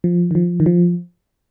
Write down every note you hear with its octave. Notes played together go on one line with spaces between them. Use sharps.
F3
D#3
F3
D#3
F3